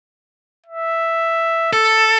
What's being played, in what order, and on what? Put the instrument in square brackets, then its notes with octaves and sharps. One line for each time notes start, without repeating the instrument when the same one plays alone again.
[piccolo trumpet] E5
[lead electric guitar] A4 [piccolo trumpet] E6